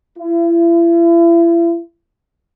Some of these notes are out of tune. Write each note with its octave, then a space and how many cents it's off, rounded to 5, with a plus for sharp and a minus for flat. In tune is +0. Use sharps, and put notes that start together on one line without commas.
E4 +40